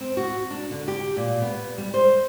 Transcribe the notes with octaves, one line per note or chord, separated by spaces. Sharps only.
C4
F#4
D4
D3
G4
A#2
B3
G3
C5